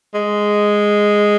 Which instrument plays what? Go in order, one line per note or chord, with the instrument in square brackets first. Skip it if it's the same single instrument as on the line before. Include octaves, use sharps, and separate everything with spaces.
[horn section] G#3